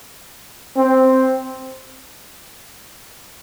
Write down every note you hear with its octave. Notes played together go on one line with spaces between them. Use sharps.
C4